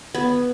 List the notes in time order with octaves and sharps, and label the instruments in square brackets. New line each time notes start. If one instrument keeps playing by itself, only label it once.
[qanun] B3